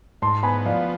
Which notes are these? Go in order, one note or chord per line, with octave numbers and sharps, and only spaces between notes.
G#2 A5 C6
B3 G#5 B5
F3 D5 F5